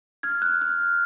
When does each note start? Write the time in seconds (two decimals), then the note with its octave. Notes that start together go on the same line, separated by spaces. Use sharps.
0.23 F6 G#6
0.42 F#6
0.62 F6